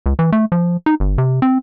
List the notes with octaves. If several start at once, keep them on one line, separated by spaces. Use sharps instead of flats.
C#2
E3
A3
F3
D#4
G1
C3
C4